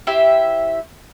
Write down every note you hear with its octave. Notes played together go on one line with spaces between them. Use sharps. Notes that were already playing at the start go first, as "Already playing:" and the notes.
E4 G4 C5 E5